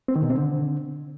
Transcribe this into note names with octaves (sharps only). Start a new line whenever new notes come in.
C4
D#3
B2
C4
D3